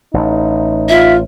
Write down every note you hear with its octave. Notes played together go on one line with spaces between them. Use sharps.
A1 D#4
F4 E5